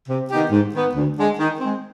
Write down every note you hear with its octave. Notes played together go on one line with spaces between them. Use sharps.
C3
D#3 B3 D#4 G4
G#2
D#3 B3
D2
D3 G#3
D#3
G#3 C4